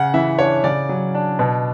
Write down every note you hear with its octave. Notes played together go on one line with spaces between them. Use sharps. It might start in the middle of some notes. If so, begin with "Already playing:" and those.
Already playing: C#3 F#5
E3 E5
D4 C#5
C#3 D5
F#3
D4
B2